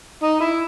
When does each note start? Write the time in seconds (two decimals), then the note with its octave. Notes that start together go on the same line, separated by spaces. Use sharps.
0.23 D#4
0.41 E4